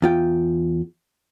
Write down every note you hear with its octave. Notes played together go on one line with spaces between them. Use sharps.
E2 F4 G5